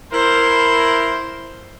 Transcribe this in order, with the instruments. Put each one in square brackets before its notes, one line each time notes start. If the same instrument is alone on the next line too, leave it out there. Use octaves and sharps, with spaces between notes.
[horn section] E4 A#4 [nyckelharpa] C5